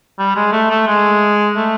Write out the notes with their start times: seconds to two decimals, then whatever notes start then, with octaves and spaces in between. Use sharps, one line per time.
0.19 G3
0.36 G#3
0.53 A3
0.70 A3
0.88 G#3
1.56 A3